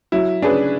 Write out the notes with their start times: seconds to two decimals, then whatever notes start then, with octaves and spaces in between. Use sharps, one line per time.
0.12 F#3 E4
0.42 C#4 D4 G#4 B4